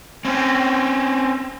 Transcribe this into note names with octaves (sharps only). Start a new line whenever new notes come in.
C4 C#4